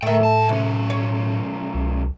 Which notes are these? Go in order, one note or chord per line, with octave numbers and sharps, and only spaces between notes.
A2 A3 A#4 E5 G5
E2 A5
B1 C3 C#4
C#5
C2